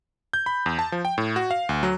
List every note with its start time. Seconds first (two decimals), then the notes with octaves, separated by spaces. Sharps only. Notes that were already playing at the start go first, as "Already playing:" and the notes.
0.33 G6
0.46 B5
0.66 E2
0.79 A5
0.92 F3
1.05 G5
1.18 A2
1.36 F#4
1.51 F5
1.69 D2
1.83 F#3